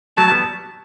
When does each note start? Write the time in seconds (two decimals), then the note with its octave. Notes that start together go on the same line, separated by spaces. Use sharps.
0.17 F#3 A3 A5
0.30 G3 B3